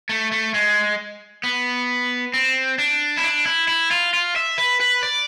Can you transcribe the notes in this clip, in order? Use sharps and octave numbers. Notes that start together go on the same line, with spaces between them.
A3
A3
G#3
B3
C4
D4
E4
D4
E4
E4
F4
F4
E5
B4
B4
D5